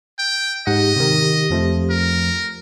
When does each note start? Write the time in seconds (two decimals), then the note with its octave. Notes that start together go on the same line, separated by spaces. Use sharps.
0.19 G5
0.67 G#2 G4 D#5 F#5
0.96 C3 D#3
1.50 F2 F3 A3
1.90 A#4